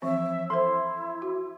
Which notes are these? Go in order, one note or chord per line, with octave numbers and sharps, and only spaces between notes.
E3 F3 C4 E5
E4 A4 C5 C6
F#4